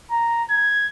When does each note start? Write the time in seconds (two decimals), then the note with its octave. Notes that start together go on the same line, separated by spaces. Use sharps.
0.11 A#5
0.50 G#6